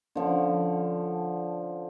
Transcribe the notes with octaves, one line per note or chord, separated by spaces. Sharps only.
D3 F3 C#4